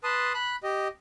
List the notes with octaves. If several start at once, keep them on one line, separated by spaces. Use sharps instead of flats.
B4 A5 C6 D#6
B5 F#6
G4 D#5